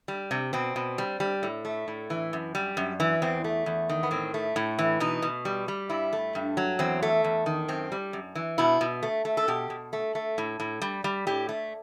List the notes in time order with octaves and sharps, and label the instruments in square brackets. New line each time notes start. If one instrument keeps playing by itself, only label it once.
[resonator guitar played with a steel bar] G3
C3
B2 C4
B2
G3
G3
A2
A3
A2
E3
F#2
G3
F#2
E3
E2 C4
A3
E2
D#3
B3
A2 C4
A3
A2
E3
B2 D#4
B2
G3
G3
G2 E4
A3
G2
F#3
E2 C4
A3
E2
D#3
F#2 C4
G3
F#2
E3
B2 E4
B2
A3
A3
A4
B2 G4
B2
A3
A3
A2
A2
G3
G3
A2 G4
A3